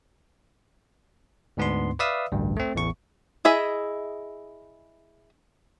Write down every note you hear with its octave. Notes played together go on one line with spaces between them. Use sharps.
D2 G#2 B3 D4 C6
B4 D5 E5 F5 D#6 E6
A1 D2 G2
A3 C4
A1 E2 C#6
E4 G#4 D#5 E5